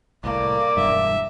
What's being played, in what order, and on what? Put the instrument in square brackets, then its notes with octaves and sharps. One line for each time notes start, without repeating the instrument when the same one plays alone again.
[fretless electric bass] C2 A2 [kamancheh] A#3 [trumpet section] D5 D6
[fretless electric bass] E1 G2 [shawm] E5